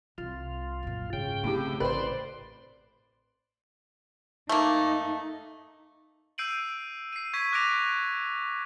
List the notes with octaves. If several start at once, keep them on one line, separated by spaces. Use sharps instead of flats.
C2 F4
F#2 A#2
G#2 C#3 G5
A2 C3 C4
A1 B4 C5 D5 C6
A3 A#3 D#4
E6 G6 C7 D7 D#7 F#7
C7 D#7
C#6 G#6 B6 D#7
D6 F#6 A#6 B6 D7 F7